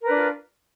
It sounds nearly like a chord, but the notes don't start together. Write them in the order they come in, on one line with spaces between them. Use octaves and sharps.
A#4 B4 D4 F4